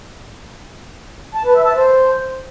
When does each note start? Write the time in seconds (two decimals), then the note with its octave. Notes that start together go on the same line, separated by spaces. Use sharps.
1.35 A5
1.45 B4
1.55 E5
1.65 A5
1.75 C5